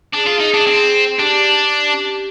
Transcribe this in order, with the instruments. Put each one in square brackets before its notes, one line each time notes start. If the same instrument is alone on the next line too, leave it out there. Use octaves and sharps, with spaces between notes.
[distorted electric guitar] D4 [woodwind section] G#4
[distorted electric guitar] F4
D#4
D4
C4
[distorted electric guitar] D4 [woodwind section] G4